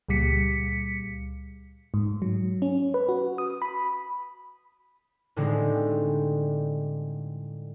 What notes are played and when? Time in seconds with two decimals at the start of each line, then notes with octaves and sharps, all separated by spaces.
0.09 C#2 A#2 G3 B6 C#7
1.94 G#2
2.22 F#3
2.62 C#4
2.94 B4
3.09 F#4
3.38 D#6
3.62 B5
5.36 A2 D3 G3 G#3 C4 D#4